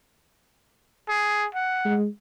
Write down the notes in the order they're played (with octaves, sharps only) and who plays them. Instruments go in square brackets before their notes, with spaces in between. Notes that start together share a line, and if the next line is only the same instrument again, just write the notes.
[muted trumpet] G#4
F#5
[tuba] G#3